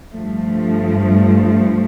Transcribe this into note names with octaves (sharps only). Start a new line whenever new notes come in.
G2 F3 A3